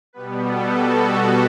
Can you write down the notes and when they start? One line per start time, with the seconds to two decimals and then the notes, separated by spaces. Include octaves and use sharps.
0.13 B2 G3 B3 B4
0.43 A4
0.72 F#4